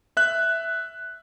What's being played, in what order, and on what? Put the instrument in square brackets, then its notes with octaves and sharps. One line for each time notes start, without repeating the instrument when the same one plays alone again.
[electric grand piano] E5 F#6